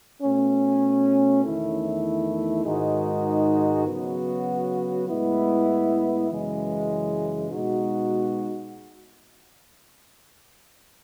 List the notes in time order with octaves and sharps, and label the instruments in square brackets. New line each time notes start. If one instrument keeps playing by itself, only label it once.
[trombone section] B2 A3 C#4
E2 D#3 A3 E4
G#2 D#3 G#3 D#4 F#4
C#3 F#3 B3 F#4
A2 G#3 B3 E4
F#2 C#3 E3 G#3
B2 G#3 D#4 F#4